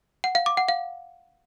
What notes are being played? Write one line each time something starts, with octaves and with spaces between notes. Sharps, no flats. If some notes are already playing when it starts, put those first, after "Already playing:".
F#5
F5
D6
F#5
F5